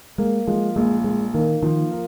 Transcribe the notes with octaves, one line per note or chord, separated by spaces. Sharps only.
G#3 A#3
F3 G#3
A#1 G#3
A#2 G#3
D#3 A#3
D#3 F3
A#4